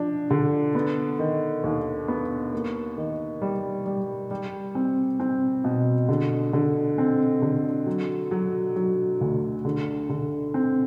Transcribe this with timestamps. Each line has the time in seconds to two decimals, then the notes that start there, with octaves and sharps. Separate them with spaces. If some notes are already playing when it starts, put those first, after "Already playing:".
Already playing: F3 D4
0.30 D3
0.75 B3
1.19 D#3
1.64 D#2
2.08 B3
2.53 A#3
2.97 D#3
3.42 G3
3.86 G3
4.31 G3
4.75 C4
5.20 C4
5.64 B2
6.09 D3
6.53 D3
6.98 C4
7.42 D3
7.87 F#3
8.31 F#3
8.76 F#3
9.21 D2
9.65 D3
10.09 D3
10.54 C4